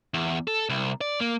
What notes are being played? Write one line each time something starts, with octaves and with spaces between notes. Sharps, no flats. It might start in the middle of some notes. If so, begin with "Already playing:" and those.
E2
A4
C2
D5
A#3